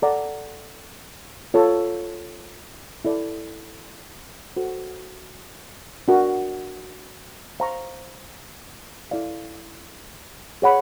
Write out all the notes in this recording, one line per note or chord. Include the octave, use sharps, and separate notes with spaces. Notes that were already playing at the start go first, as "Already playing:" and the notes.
A4 D5 F#5 A#5
F4 A4 C#5
E4 A4 D5
F#4 A4 C5
D4 F#4 A#4
C5 F5 A#5 C#6
E4 A4 D5 F5
G#4 C#5 F#5 B5